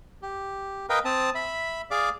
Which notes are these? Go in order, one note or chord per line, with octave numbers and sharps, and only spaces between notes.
G4
A#4 B4 D#5 F5 G5
C4 A5 D#6
E5 B5
G#4 D5 F5 D6